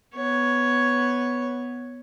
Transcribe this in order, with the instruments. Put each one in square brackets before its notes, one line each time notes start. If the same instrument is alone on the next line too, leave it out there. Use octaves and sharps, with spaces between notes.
[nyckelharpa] B3 C#5